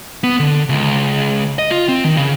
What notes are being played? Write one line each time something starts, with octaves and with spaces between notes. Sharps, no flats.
B3
D3
C#2
D#5
F4
C4
D#3
C#3